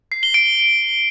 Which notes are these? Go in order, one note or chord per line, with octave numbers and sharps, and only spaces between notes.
C7
G7
D7